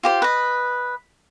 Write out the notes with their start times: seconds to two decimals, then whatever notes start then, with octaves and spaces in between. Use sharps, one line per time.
0.03 F4 G4 C5
0.22 B4 D#5